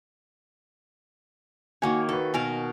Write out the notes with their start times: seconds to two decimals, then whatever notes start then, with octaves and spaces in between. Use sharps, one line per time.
1.82 D#3 A#3 F#4 C#5 G#5
2.09 F#4 A4 B4
2.34 B2 A#4 F5 G#5